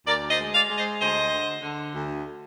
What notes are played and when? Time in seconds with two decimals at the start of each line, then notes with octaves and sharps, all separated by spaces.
0.07 D2 A#4 D5
0.30 C5 D#5
0.38 G#3
0.54 D5 F5
0.69 G#3
0.76 C5 D#5
1.00 D2 C5 D#5
1.32 D3
1.63 D3
1.94 D2